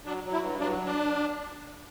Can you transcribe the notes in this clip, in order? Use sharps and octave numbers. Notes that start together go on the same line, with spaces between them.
F#3 D4
F#3
E4
G2
F#3 D4
D4